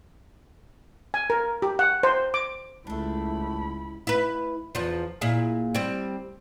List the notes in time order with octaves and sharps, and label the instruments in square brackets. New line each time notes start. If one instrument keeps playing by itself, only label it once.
[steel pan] G#5
A#4
G4
F#5
C5
D6
[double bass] C#2 [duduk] A3 [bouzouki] D4 A4 [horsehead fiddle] E4 B5
[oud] E4 B4
E2 F3
A#2 E4 G#4
G3 C4